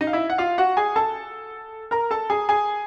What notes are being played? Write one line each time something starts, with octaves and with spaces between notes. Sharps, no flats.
D#4 D#5
F5
E4 E5
F#5
F4 F5
F#4 F#5
G#4 G#5
A4 A5
A#4 A#5
A4 A5
G#4 G#5
G#4 G#5